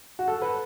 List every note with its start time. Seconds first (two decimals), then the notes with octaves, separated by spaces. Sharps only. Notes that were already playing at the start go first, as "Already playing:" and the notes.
0.19 F#4
0.28 A4
0.42 B4